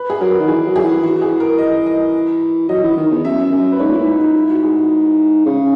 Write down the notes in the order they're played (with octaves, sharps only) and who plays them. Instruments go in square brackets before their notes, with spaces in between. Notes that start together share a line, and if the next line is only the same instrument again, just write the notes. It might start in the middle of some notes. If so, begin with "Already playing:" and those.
Already playing: [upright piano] B4
G#4
[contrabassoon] F#3 [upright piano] A#4
[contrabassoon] D#3
[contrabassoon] E3 [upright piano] G#4
[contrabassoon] F#3
[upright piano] G#4
[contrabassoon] E3
[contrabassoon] E3 [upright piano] F#4
[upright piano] G#4
A#4
D#5
D#5
[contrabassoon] F#3 [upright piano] D#5
[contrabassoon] E3
D#3
E2
[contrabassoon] F#2 [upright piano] E5
[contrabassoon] F#2
[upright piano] B4
[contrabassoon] G#2 [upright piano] C#5
[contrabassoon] A#2
[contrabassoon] G#2 [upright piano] E4
[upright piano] D#4
E4
E4
F#4
G#4
F#4
[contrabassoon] C#3